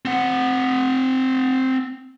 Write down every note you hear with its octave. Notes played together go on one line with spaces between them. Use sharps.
C4 F#5